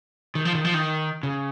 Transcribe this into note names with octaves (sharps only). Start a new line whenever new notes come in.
D#3
F3
D#3
F3
D#3
C#3